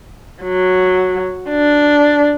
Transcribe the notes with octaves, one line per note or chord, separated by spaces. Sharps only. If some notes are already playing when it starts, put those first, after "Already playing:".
F#3
D4